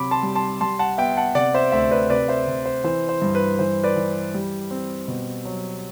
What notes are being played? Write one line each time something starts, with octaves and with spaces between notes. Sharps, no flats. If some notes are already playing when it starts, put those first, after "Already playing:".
Already playing: C3 F#3 B5 D6
A5 C6
G3
A5 C6
G3 A5 C6
F#5 A5
B3 E5 G5
F#5 A5
C3 D5 F#5
C5 E5
D2 C5 E5
B4 D5
C3 B4 D5
C5 E5
C3
C5
E3 C5
C5
G2
B4
E3 C5
B4 D5
E3
G3
C4
B2
F#3